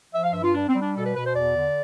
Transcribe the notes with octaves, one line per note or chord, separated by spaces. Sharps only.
F3 E5
F5
G2 E5
E4
F4
G3 D4
C4
G3
D4
B2 A4
B4
B2 B4
C5
E2 D5
D3